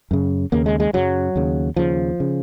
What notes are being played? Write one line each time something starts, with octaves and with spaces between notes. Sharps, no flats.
F#2 C#3
D#2 C#3 A#3
G#3
G#3
F#2 C#3 F#3
D#2 C#3
D#2 C#3 F3
C#3